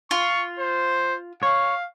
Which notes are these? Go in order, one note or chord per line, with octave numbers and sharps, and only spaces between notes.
F4 C#6
C5
C#5 F5